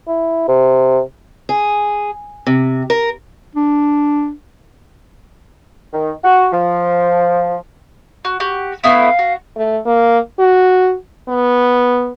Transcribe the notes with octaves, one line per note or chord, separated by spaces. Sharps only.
E4
C3
G#4
C3
A#4
D4
D#3
F#4
F3
F#4
F#4 G4
A3 B3 E4 F5
F#4
A3
A#3
F#4
B3